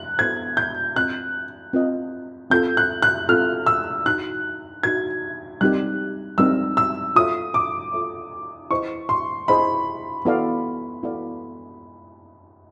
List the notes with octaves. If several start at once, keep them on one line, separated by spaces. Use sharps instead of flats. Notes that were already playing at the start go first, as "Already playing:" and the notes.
Already playing: F#6
B3 E4 A4 C5 G#6
G6
C4 F4 A#4 D#5 F#6
C4 F4 A#4 D#5
C4 F4 A4 G6
F#6
F#6
C4 F4 A4 F6
E6
D#4 F#4 A#4 F#6
D#4 F#4 A#4 G#6
G3 C4 D#4 G4 A#4 F#6
G3 C4 D#4 G4 A#4 E6
E6
F4 A4 C#5 E5 D#6
D6
F4 A4 C#5 E5
E4 G#4 C5 D#5 C#6
C6
E4 G#4 C5 D#5 B5
B3 E4 A4 D5 F5
B3 E4 A4 D5 F5